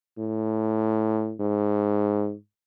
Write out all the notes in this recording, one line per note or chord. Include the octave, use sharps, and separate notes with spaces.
A2
G#2